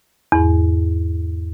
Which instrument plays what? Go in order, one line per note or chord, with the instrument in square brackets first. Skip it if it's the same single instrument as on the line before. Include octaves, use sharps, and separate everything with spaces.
[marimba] E2 G#2